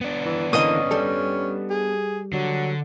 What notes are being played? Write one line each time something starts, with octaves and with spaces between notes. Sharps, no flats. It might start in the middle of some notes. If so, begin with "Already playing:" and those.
B3 D4
E3
D3 E3 A#3 C#4 D#5 D#6
G3 A4
G#4
D3 F#3